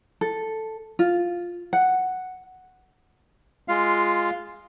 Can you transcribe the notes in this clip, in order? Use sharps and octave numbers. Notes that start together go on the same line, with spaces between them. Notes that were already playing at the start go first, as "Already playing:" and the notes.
A4
F4
F#5
G#3 F4 F5